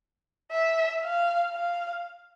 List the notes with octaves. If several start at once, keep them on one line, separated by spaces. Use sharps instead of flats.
E5
F5
F5